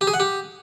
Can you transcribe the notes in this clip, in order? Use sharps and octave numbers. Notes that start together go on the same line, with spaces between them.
G4
G#4
F#5
G4